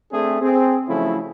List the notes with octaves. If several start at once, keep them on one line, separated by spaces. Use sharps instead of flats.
A3 C4 D4 G#4
C4 G#4
C#3 F3 F#3 A3 E4